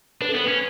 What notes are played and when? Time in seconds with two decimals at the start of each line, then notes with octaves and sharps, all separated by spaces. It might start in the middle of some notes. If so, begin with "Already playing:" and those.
0.21 D4 B4
0.29 A4
0.35 B3 B4
0.48 C#4